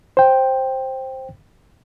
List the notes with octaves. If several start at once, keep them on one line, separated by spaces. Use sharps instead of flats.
C5 G5